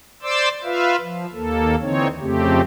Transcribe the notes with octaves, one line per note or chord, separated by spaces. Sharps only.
C5 D5 C6 D6 E6
F4 B4 E5 F5
F3
D#2 A#3 A4
D3 E3 C4 D#4 C#5
F2 C#3 A3 C4 G4